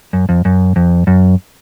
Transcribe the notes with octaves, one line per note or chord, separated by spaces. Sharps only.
F#2
F2
F#2
F2
F#2